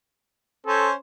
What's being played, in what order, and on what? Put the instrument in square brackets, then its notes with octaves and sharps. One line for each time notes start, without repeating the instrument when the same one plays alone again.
[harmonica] C#4 C5 [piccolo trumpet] A4